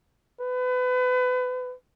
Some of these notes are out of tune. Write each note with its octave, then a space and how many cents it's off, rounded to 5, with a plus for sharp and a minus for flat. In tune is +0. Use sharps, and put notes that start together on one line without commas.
B4 +30